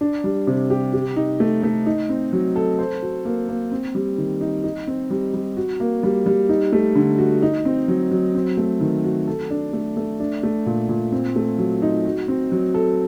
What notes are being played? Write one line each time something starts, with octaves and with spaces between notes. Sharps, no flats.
D4
G3
C3
G4
G4
D#4
A3
A3
D#4
C4
F#3
A4
C5
F#4
A#3
A#3
C4
G3
D#3
D#4
D#4
C4
G3
G3
F#4
A#3
G3
G3
D#4
A3
D3
F#4
D#4
C4
F#3
F#3
C4
A3
D#3
F#4
A4
D4
A3
A3
D4
A3
A#2
A#2
C4
A3
F#3
D#4
F#4
C4
F#3
A4